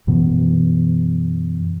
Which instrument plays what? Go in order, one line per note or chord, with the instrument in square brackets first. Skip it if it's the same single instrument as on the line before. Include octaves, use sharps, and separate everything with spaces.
[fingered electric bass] F#2 B2 E3 B3